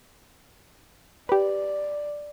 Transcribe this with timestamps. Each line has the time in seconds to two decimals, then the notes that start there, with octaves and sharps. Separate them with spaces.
1.29 G4 B4 D5